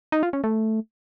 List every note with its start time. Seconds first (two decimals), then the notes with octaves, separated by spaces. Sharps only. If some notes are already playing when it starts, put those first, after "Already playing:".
0.12 D#4
0.23 F4
0.33 C#4
0.44 A3